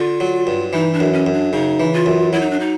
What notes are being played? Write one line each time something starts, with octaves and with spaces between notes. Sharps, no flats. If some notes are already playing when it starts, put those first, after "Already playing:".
Already playing: D3 F4
F#3
G2
E3 D#4
D4
F#2
C#4
F#2
D4
C#3 D#4
E3
F4
F#2
F#3 E4
D#4
D4
D#4